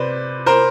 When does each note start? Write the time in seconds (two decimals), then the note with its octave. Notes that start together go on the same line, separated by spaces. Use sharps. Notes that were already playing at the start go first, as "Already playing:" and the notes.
Already playing: C3 B4 C5 D5
0.46 A#4 C5